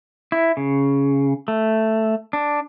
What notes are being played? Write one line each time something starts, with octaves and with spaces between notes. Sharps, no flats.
E4
C#3
A3
D4